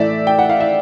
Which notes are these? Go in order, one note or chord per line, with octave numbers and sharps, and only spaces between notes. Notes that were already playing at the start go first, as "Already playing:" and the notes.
Already playing: A2 E3 A3 D5 E5
G5
F#5
F5
E5